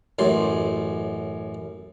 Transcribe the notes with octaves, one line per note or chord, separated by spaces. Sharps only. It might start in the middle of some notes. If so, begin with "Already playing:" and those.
A1 F#2 C6